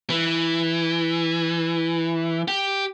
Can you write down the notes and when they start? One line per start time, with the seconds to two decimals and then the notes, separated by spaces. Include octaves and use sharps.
0.10 E3
2.48 G4